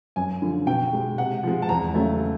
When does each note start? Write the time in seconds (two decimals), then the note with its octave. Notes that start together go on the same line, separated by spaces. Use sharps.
0.16 F#2 G#5
0.42 D3 F3
0.67 B2 G5
0.93 G#3
1.18 C3 F#5
1.43 F3 G#3
1.62 A5
1.69 E2 A#5
1.94 C#3 F#3 A3